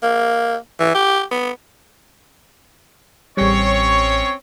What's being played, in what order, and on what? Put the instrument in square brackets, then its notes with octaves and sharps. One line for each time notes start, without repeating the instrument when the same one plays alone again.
[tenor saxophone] A#3
E3
G4
B3
[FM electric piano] A1 G3 [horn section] C4 C#4 C#5